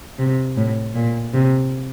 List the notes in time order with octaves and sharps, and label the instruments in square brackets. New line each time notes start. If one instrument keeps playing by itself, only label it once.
[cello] C3
A2
A#2
C3